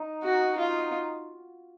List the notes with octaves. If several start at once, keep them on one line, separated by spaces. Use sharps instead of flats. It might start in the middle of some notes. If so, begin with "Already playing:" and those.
Already playing: D#4
F#4
F4